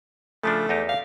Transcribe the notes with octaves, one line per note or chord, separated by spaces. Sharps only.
C#3 F3 A3 D4
E2 D#4 G4
F5